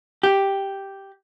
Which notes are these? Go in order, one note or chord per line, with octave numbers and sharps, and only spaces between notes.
G4